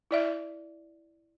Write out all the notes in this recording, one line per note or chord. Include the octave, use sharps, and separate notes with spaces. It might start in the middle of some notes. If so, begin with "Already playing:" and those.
E4 D5 E5